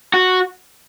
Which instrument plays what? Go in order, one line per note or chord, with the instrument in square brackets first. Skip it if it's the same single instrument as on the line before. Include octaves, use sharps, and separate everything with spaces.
[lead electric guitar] F#4